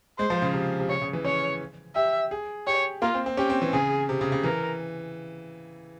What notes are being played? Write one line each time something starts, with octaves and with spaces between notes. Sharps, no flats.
G#3 C5
F3
C#3
C3
C3
C#3 C#5
C#3
E3
C#4 C#5
G4 E5
G#4
G4 C#5
A#3 F4
C4
C4
C#4 G4
C4
E3
C#3 G#4
C3
C#3
C#3
E3 A#4